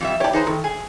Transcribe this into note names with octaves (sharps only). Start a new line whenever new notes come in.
F2 G3 E5
G4 C#5 D5 G5 A5
D#4 G#4 B4 C5 A#5
D#3 A4
G#4 G#5